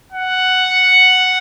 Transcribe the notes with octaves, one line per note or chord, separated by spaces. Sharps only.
F#5